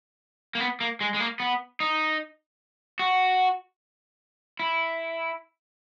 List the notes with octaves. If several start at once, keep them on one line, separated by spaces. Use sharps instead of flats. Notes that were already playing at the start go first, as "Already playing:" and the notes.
A#3
B3
A#3
G#3
G#3
A#3
B3
D#4
F#4
E4